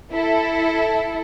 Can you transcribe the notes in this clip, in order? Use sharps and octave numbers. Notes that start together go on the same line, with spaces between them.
E4 A4